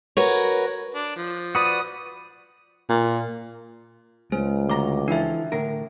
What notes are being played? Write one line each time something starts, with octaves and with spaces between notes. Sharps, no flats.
F#4 A#4 B4 C#5
D4
F3
F#4 B4 D5 D#6
A#2
C#2 G#3 C5
D2 A#5 D6
E3 F3 D4 A4 E5
A2 D3 A#4